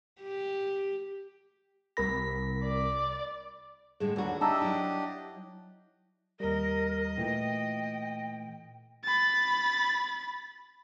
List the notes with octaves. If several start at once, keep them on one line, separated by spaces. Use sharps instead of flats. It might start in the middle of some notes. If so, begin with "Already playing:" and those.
G4
C2 A#4 B5 A#6 B6
D5
A2 D3 G#3 G#4
D#2 D3 F#3 G3 F#4
D4 D#4 G4 D#5 E5 A5 A#5 E6
F#3 E4
D#2 G3 A#4 D#5
A#2 E3 A3 G5
B5 A6